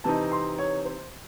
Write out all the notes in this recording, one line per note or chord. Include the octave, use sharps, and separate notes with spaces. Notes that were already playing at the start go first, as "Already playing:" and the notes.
C3 E3 C4 D#4 A5
C6
C#5
C5